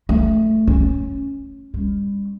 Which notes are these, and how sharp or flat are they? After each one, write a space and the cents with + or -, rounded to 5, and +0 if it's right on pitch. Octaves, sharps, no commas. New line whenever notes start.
A3 +0
C#4 -10
G3 +35